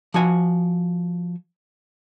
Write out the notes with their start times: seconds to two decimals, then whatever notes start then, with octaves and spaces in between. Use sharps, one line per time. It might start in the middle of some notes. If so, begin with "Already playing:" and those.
0.14 F3 F#4 G#5